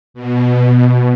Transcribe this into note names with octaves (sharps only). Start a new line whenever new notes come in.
B2